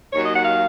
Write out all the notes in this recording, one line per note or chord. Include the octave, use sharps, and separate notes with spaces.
D#2 D#3 F#3 C#5
D#5
F#5
F5